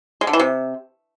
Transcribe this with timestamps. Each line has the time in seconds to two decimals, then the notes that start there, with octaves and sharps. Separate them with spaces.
0.21 G#3
0.27 D3
0.33 E3
0.39 C3